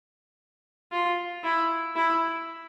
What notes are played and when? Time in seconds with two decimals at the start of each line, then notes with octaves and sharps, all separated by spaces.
0.92 F4
1.44 E4
1.96 E4